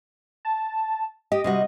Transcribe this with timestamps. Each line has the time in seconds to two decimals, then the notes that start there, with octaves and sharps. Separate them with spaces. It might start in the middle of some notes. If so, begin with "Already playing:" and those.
0.45 A5
1.32 G4 D#5
1.44 C3 G3 F#4